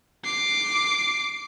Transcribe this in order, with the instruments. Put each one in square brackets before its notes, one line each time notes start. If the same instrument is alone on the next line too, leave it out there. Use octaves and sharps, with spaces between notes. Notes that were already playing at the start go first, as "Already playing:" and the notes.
[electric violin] D6 C7